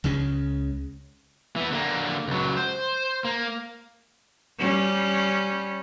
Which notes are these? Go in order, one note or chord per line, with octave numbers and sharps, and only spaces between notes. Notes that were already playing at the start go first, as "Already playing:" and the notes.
C#2 C#3 G#3 C#4
E3 B3
D3 A#3
C#2 F#3
C5
A#3
G3 C#4